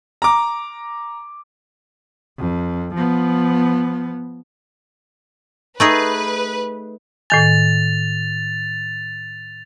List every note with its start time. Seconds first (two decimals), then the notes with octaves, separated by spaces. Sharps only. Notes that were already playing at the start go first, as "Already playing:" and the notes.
0.22 A#5 D6
2.38 F2
2.94 F3 B3
5.80 A3 D#4 G#4 B4
7.30 A2 D#3 G#5 A6 F7